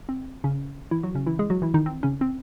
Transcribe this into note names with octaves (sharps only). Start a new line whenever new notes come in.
C4
C#3 C#4
E3 E4
F#3 F#4
C#3 C#4
E3 E4
G#3 G#4
F#3 F#4
E3 E4
D#3 D#4
C4
C#3 C#4
C4